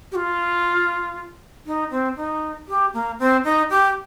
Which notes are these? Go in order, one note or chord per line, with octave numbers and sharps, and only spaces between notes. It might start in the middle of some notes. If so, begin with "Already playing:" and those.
G4
F4
D#4
C4
D#4
G4
A#3
C4
D#4
G4